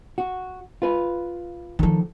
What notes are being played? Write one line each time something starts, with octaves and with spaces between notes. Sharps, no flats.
F#4
F4 B4
D3 D#3 F3 A4